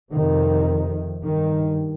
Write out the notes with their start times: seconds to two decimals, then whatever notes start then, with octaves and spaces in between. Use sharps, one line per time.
0.11 F2 C3 D#3
1.25 G2 D#3